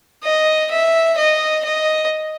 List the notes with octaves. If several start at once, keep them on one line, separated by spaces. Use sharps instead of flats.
D#5
E5
D#5
D#5